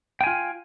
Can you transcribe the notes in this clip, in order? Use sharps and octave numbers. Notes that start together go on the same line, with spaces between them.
F4 G5 G#5